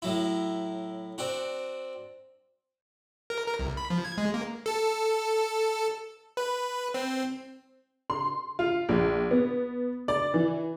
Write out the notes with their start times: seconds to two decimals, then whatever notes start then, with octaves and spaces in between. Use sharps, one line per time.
0.02 A2 F#3 E4
1.18 C4 D4 F#4
3.30 A#4
3.46 A#4
3.59 C2
3.77 B5
3.90 F3
4.04 G#6
4.18 G#3
4.34 A#3
4.66 A4
6.37 B4
6.94 C4
8.10 C6
8.59 F4
8.89 A#1
9.31 B3
10.08 D5
10.34 E3